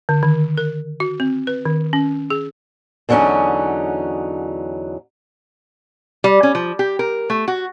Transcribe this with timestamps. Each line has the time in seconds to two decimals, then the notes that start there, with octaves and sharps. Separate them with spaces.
0.09 D3
0.23 D#3
0.58 A#4
1.00 F#4
1.20 C4
1.47 B4
1.65 D#3
1.93 C#4
2.30 G#4
3.09 E2 D3 F#3 G3 C#4 D#4
6.24 G3
6.43 C#4
6.55 F3
6.79 G4
6.99 A#4
7.30 A3
7.48 F#4